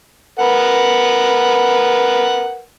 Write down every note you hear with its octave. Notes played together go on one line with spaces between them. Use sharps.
A#4 B4 F#5